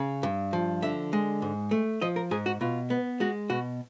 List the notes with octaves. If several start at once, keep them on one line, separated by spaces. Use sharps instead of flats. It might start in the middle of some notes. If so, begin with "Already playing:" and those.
Already playing: C#3
G2
F3
D3 E5
G#3
G#2
A3
F3 D#5
A#4
G#2 G#4
F#4
B2 F4
B3
G#3 F#4
B2 F#4